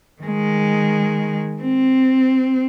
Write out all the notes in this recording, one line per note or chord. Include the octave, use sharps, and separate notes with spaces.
D#3 G#3
C4